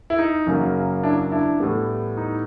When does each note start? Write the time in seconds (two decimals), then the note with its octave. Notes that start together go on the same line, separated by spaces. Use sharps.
0.10 E4
0.18 D#4
0.47 F#2 C#3 F#3 A#3
1.03 D4 E4
1.32 D4 E4
1.60 A2 E3 G3 B3
2.17 D#4